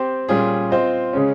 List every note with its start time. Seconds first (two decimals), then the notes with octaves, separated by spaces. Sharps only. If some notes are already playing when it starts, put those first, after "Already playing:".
Already playing: C4 G4 C5
0.29 A#2 G3 C#4 F4 G#4
0.71 C4 F4 C5 D#5
1.13 C#3 G#3 C#4